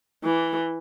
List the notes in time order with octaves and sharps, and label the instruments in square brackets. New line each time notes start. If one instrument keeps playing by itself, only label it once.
[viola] E3